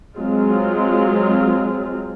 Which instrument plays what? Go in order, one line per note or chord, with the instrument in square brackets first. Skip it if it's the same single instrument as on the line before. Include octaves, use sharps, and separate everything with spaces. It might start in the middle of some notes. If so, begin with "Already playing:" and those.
[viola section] F#3 G#3 C4 F4